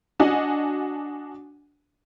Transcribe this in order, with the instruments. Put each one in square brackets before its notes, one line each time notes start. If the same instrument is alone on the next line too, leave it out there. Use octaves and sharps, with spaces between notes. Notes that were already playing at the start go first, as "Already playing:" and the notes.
[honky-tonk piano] D4 F#4 D#5 F#5 G#5